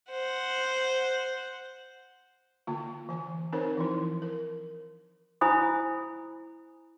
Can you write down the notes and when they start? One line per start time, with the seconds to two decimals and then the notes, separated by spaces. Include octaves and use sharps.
0.11 C5 F#5
2.67 D3 A#3 F4
3.09 E3 G#5
3.53 C4 D#4 A#4 C5 C#5
3.77 E3 F3 E4
4.22 A#4
5.41 E4 C5 G#5 B5 D#6